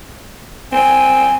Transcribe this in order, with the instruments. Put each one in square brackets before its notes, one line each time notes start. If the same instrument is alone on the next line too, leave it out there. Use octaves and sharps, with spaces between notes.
[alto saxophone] C4 [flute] G#5